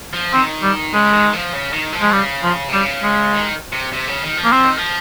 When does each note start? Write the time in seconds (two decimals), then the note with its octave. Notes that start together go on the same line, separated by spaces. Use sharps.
0.13 F3
0.33 D#3 C4
0.63 G3
0.93 C#3 G#3
1.13 D#3
1.33 F3
1.53 C#3
1.72 D#3
1.93 F3
2.02 G#3
2.12 C#3 G3
2.43 F3
2.69 C3
2.73 C#3 G3
3.03 G#3
3.33 D#3
3.72 C3
3.92 C3
4.08 C#3
4.22 D#3
4.37 F3
4.45 A#3
4.52 F3 C4
4.65 D#3
4.77 F3